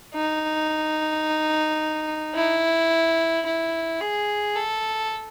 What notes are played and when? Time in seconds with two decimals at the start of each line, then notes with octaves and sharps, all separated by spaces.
0.15 D#4
2.35 E4
3.46 E4
4.01 G#4
4.55 A4